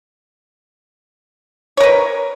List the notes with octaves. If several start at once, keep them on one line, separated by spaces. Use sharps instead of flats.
A#4 B4 C#5